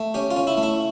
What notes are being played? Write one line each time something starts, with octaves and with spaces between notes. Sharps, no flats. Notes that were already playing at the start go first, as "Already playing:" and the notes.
Already playing: A3
C#4 G4
F4
C#4
E4
A3
E4